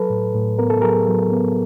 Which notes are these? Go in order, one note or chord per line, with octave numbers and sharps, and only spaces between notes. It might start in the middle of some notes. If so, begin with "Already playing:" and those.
Already playing: F#3 A4 B4
A2
A2
B3 A#4
A4
F#3 G#4 A#4
F#3
B3